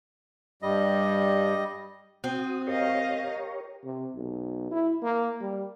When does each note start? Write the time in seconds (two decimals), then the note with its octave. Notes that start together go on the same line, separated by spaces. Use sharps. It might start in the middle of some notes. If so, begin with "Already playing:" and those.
0.62 G2 G3 D#5
2.24 C4 F#4 D#6
2.67 G4 A#4 C#5 D#5 F5
3.84 C3
4.16 B1
4.71 E4
5.03 A#3
5.41 G3